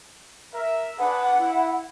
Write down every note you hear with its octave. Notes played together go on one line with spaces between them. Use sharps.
A#4 E5
D4 G#4 B4 F#5
E4